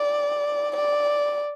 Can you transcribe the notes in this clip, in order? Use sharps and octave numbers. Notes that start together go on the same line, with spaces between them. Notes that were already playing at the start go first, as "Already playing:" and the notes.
Already playing: D5
D5